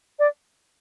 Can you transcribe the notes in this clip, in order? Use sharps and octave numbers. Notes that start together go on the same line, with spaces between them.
D5